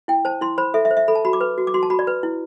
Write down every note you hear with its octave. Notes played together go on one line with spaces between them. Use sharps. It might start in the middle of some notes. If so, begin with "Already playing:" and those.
E4 G5
C5 A5
E4 C6
C5 B5
A4 E5
E5
C5
E5
A4 B5
A5
F#4 B5
D6
B4
F#4
D6
F#4 C6
A5
F#4 B5
D5
B4
E4